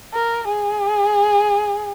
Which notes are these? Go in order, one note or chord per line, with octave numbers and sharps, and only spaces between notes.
A#4
G#4